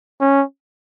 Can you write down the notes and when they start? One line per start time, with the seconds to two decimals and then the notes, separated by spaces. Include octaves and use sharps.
0.20 C#4